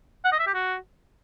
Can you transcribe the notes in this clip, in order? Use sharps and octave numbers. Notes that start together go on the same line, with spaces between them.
F#5
D#5
E5
G4
F#4